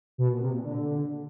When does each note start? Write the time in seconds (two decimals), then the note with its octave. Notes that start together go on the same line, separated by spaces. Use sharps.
0.18 B2
0.29 A#2
0.41 C3
0.52 A#2
0.63 D3